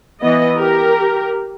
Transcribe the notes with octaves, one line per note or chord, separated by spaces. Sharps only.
E3 B3 D#5
G4 A#4